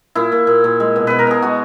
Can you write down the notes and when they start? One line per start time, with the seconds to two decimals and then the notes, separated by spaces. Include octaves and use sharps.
0.15 A#2 E4
0.32 A#2
0.47 A#2
0.64 A#2
0.80 G#3
0.96 B2
1.07 B2 B4
1.19 A#4
1.27 B2 G#4
1.42 G#3 F#4